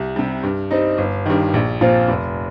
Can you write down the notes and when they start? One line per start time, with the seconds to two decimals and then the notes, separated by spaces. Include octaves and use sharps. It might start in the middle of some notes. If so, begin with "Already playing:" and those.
Already playing: C2
0.16 C3 G3
0.43 G2
0.71 G3 C4 D#4
0.98 G1
1.26 G2 D#3
1.54 A#1
1.81 A#2 F3 C4 F4
2.08 F1